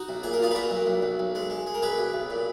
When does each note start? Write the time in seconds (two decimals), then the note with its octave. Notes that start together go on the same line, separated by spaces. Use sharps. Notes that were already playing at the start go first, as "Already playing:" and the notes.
Already playing: D#4 F#4
0.09 B1
0.23 A#2 G#4
0.33 A#4
0.39 A#2 F4 G#4
0.51 B4
0.55 A#2 F#4 A#4
0.71 B1
0.87 B1
1.02 B1
1.19 B1
1.35 G#3
1.50 G#3
1.67 G#3
1.74 A#4
1.82 B1 G#4 B4
1.98 B1
2.14 B1
2.30 A#2